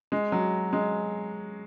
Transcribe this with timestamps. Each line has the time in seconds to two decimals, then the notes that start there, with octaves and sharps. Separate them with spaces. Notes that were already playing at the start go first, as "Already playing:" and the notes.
0.12 G#3
0.32 F#3
0.73 G#3